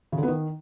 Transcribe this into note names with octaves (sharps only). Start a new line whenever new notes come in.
C#3
D3
B3
D#3